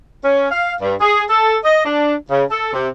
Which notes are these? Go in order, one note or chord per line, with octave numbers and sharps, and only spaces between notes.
C#4
F5
G2
G#4
A4
D#5
D4
C#3
A4
C3